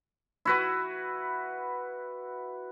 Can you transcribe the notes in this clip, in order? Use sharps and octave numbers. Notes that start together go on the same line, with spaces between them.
E4 F#4 B4